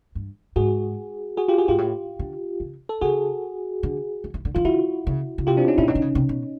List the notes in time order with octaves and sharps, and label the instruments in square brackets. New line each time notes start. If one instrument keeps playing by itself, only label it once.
[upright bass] G2
[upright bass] G#2 [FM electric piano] F#4 G#4
[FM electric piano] F#4 G#4
F4 G4
F#4 G#4
[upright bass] G#2 [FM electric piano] F4 G4
[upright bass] A2
D3
C#3
[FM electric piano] A4
[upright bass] C#3 [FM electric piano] F#4 G#4
[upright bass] D3
E3
E3
D3
[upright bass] D#3 [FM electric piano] F4
[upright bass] D3 [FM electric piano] E4 F#4
[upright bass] C#3
C#3
[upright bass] C3 [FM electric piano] F4 G4
[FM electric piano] C4 D4
C#4 D#4
[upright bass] A#2 [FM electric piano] D4 E4
[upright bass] B2 [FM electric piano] C#4 D#4
[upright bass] D3
C#3
C3
B2